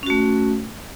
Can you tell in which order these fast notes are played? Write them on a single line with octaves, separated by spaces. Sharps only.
C#4 F#4 A3